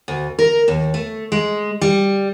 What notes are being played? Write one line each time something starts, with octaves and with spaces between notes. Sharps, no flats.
D2
A#4
D#2
A3
G#3
G3